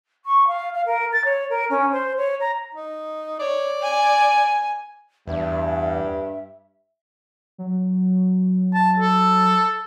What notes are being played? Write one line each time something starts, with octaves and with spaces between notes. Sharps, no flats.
C#6
F5
F5
A#4
A6
C#5
A#4
C#4
C5
C#5
A#5
D#4
C#5 D5
G#5
E2 G2 E5
F#3
A5
A4